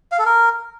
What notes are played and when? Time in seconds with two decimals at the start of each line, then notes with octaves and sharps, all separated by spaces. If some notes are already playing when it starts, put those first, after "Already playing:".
0.12 F5
0.19 A4
0.26 A#4